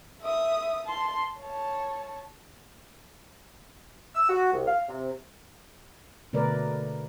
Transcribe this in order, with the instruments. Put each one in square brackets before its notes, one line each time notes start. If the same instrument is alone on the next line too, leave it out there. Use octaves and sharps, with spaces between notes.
[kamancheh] E5 D#6
A5 C6
C#5 A5
[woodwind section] E6
F#4
C2
F5
C3
[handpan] B2 D3 A3 A#4 B4 D5